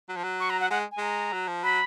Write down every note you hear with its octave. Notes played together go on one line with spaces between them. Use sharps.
F#3
F3
F#3
C#6
A#5
F#5
G#3 F#5
G#5
G#3 A#5
F#3
F3
F#3 B5